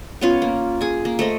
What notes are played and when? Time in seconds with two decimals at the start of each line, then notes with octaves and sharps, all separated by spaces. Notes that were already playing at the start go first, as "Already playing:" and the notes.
0.21 B3 C#4 F4
0.42 A#3
0.81 G#4 G#5
1.05 A#3
1.19 A3 C5 D#5